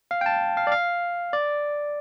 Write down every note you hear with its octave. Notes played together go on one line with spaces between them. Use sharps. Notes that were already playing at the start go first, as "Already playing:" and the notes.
F5
G5
A5
F5
D5
F5
D5